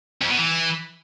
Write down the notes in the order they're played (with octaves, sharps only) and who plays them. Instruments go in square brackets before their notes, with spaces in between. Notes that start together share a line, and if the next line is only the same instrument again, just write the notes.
[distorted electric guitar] F2
B2
E3